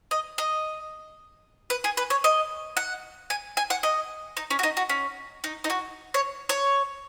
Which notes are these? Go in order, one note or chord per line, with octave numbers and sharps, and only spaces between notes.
D#5
D#5
B4
G#4
B4
C#5
D#5
F#5
G#5
G#5
F#5
D#5
D#4
C#4
F#4
D#4
F#4
C#4
D#4
D#4
F#4
C#5
C#5